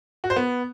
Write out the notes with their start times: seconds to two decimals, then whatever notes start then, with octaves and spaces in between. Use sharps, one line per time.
0.24 F#4
0.30 C5
0.36 B3